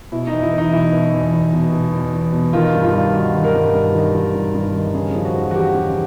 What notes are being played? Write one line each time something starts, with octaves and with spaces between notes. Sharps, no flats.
B2 E4
D#4
E2
E4
E2
D#4
B2 E4
B2
E2
E2
B2
B2
E2
E2
B2
D#3 F4
G2
F4
G2
D#3 F#4
D#3
A#4
G2
G2
D#3
D#3
G2
G2
D#3
C#3 G#4
F3
F#4
E2
F#4
E2 G4
C#3